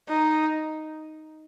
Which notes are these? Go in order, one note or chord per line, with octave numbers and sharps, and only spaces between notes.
D#4